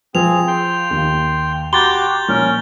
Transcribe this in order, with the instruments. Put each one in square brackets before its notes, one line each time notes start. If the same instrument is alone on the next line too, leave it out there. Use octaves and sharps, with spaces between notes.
[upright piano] F3 F4 [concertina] C4 G#4 [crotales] F7
[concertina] G5 C6
[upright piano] D#2
[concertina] F#4 G4 D6 [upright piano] A#5 C6 [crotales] G6 A6 G7
[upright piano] A#1 [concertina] C#4 A#4